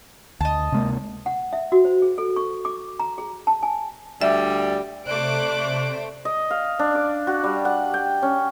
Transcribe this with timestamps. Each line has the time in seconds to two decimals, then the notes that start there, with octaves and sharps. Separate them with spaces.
0.41 D2 D#5 A5
0.72 C3 G#3 A#3
1.26 F#5
1.53 E5
1.72 F#4
1.85 C5
2.02 G#4
2.18 A4
2.36 C#6
2.65 D6
3.00 A#5
3.18 G#4
3.47 A5
3.63 G#5
4.21 D2 G3 D5 E5
5.06 C3 A3 C5 D5 D6 F#6 D7
6.25 D#5
6.51 F5
6.79 D4
6.95 D6
7.27 F#4
7.44 G3
7.65 F#5
7.94 G5
8.22 C#4